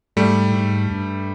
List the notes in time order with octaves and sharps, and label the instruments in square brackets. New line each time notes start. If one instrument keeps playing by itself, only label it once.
[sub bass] G#2 [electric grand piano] G3 A3
[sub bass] A2
G#2
G2